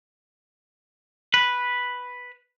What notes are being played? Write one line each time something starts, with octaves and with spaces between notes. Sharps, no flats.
B4